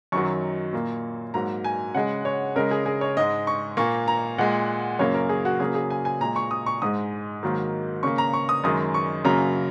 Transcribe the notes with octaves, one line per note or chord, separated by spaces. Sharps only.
F#2 D#3 F#3 C#6
A#2 A#3
G#2 F#3 A#3 A#5
G#5
C#3 G#3 F#5
C#5
C#3 G#3 A#4
G#4
G#4
C#5
G#2 G#3 D#5
C#6
A#2 A#3 C#6
A#5
A#2 G#3 F#5
F#2 C#3 A#3 C#5
A#4
G#4
F#4
C#3 F#3 A#3 G#4
G#4
G#5
G#5
A#2 G#3 A#5
C#6
D#6
C#6
G#2 G#3 D#6
G#2 D#3 F#3 A#3
C#3 A#3 C#6
A#5
C#6
D#6
F#2 D#3 G#3 D#6
C#6
F#2 C#3 F#3 A#3 A#5